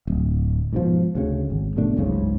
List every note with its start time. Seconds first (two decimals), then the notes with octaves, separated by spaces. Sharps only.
0.07 D1
0.73 G#2 B2 F3
1.15 D2 C#3
1.50 G#1
1.76 G#2 B2 A3 D4
1.97 F#1 C#2 G#2 C#3